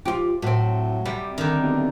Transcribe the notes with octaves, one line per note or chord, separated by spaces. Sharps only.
F3 F4 G4
A2 F#3 C4
C3 G3
D3 D#3
B1